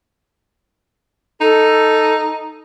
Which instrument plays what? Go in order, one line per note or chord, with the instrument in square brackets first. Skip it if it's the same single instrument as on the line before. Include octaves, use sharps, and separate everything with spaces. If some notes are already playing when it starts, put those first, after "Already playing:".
[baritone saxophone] D#4 [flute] A4